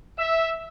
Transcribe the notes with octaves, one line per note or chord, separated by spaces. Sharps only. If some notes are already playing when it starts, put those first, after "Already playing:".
E5